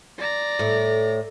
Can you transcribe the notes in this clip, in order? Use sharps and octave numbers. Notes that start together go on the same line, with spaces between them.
D5 A#5
A2